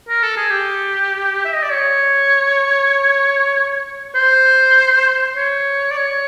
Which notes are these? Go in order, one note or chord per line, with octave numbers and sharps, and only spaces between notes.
A#4
A4
G#4
G4
E5
D#5
D5
C#5
C5
C#5
D5
C#5